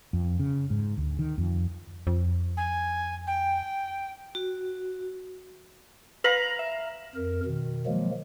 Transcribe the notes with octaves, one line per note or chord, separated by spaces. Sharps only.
F2
C#3
G#2
D2
D#3
F2
F2
G#5
G5
F#4
B4 F5 A#5 F#7
E5
F2 A#4
B2 D#3
D#3 F3 F#3 G#3 A#3